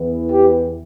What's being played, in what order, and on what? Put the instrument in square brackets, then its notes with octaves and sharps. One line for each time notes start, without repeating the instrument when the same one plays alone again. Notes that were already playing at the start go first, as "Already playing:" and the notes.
Already playing: [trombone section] E2 E3 B3
G4